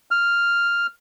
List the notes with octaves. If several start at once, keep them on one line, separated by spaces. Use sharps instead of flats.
F6